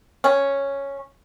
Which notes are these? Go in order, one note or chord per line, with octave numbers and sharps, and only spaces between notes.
C#4